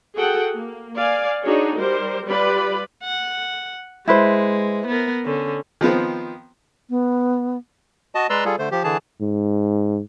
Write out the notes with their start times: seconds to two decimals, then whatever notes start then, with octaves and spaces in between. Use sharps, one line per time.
0.15 F#4 G#4 A4 F#5 G5
0.54 A#3
0.95 D5 F5 G#5
1.43 D4 D#4 F#4 G#4 C#5
1.77 G3 A#4 C5
2.27 G3 F4 G4 B4 D5 B5
3.04 F#5
4.08 G#3 E4 B4 C5
4.87 B3 A#4
5.25 D3 C#4
5.81 D#3 F3 B3 C4
6.90 B3
8.15 F#4 D#5 A5
8.30 G#3 B4 D5 A#5 C6 E6
8.45 G3 F4 G#4 A4
8.59 D3 A3 C5
8.71 F3 G4
8.84 D3 E3 G#4 A5
9.21 G#2